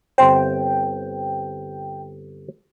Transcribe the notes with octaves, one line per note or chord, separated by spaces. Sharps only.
G1 C4 C5 G5